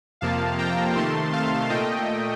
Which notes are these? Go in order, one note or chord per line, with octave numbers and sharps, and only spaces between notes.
F2 C3 F3 A#3 F5 A5
G5 A#5
C3 D#3 A3 A5 C6
F5 A5
A#2 A3 D#5 G5